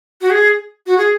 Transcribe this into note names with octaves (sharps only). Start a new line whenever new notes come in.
F#4
G#4
F#4
G#4